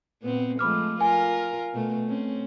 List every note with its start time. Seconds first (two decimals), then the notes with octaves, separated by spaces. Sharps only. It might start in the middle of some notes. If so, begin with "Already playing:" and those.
0.22 A#2 B3 C4
0.59 F3 G#3 A3 B5 D6 F6
1.01 F4 A#4 G#5
1.74 B2 A3
2.07 C4 C#4